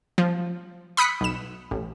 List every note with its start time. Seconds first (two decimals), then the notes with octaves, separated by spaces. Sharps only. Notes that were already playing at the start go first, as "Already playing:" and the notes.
0.18 F3
0.97 B5 D#6 F#6 B6 C#7
1.21 B1 E7
1.71 A1